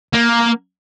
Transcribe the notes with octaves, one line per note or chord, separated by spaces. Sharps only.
A#3